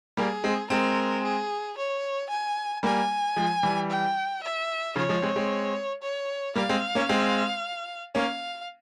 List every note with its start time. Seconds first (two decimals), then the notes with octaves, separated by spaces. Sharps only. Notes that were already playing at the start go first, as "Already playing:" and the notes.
0.17 G3 A#3 G#4
0.44 G#3 C4
0.70 G#3 C4 A#4
1.24 G#4
1.77 C#5
2.30 G#5
2.83 G3 A#3 G#5
3.36 F3 G#3
3.63 E3 G3
3.90 G5
4.43 E5
4.96 C#3 F3 C#5
5.09 F3 G#3
5.22 G#3 C4
5.36 G#3 C4
6.03 C#5
6.55 G3 A#3 F5
6.69 G#3 C4
6.95 A#3 C#4
7.09 G#3 C4
8.15 A#3 C#4 F5